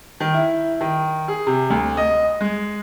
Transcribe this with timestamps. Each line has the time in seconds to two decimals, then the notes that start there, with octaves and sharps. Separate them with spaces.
0.20 D#3
0.34 E4
0.81 D#3
1.28 G#4
1.47 C3
1.70 D2
1.97 D#5
2.41 G#3